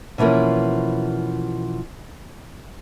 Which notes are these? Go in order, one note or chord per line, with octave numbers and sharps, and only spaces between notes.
B2 E3 F3 A#3 C#4